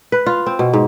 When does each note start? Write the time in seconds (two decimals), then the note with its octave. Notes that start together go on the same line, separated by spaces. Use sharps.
0.12 B4
0.26 F4
0.46 C4
0.59 B2
0.73 G#2